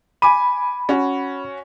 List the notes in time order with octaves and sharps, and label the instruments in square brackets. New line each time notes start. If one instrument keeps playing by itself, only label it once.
[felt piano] G#5 D6 D#7 [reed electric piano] B5
[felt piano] C#4 F#4